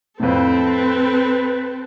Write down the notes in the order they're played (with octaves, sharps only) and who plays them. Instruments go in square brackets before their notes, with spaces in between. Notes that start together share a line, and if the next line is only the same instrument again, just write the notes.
[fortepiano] F2 A2 [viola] C4 A4 [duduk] B4